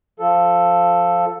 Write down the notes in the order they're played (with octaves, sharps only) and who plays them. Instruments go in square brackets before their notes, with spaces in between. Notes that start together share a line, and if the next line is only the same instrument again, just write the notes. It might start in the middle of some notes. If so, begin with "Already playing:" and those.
[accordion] F3 A4